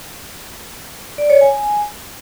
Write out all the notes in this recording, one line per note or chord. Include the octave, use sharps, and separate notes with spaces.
D5
C#5
G#5